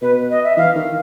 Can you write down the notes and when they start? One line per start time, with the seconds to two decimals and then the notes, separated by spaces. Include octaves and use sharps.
0.01 B2 B4
0.30 D#5
0.44 E5
0.57 E3 F5
0.76 D#3